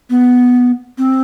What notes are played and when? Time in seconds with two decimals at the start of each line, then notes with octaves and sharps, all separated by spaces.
0.10 B3
0.98 C4